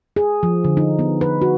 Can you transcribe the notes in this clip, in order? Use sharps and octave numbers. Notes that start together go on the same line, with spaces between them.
G#4
F3
D3
D#4
B3
B4
F#4